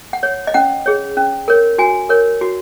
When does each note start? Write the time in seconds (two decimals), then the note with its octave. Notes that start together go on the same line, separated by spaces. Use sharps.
0.13 F#5
0.23 C#5
0.47 D#5
0.54 C#4 F#5
0.86 G#4 C#5
1.17 C#4
1.48 A#4 C#5
1.78 F#4 G#5
2.09 A#4 C#5
2.41 F#4